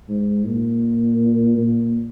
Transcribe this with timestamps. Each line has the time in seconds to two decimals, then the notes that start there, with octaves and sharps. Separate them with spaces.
0.09 G#2
0.46 A#2
1.57 A#2